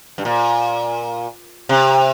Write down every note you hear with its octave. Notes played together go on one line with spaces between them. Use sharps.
G2
A#2
C3